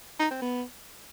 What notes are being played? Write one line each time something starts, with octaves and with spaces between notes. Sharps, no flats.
D#4
C4
B3